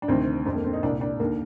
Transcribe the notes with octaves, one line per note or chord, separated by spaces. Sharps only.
D4
D2 C3 D#3 C4
F2 D3 C4
A#3
C4
D#4
C2 A#2 D4
D4
D#2 D3 A#3